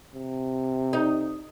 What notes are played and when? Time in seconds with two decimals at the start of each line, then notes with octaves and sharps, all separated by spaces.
0.15 C3
0.93 D#4